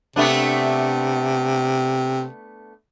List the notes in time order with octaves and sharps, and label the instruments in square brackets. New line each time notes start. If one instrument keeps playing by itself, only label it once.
[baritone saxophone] C3 [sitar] A3 B3 D4